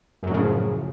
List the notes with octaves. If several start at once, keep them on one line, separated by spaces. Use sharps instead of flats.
F#2 A2 C#3 F3 F#3